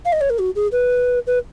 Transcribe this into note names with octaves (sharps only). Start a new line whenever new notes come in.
F5
D#5
C#5
A#4
F#4
G#4
B4
B4